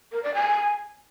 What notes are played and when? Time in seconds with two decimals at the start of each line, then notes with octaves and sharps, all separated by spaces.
0.12 A#4
0.23 D5
0.34 G#5